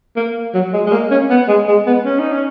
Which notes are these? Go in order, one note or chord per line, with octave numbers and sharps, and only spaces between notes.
A#3
F#3
G#3
G#3
A#3
C#4
B3
G#3
G#3
B3
C#4
D#4
C#4